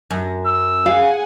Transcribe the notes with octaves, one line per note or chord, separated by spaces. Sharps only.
F#2
E6
G#4 F5 F#5 G#5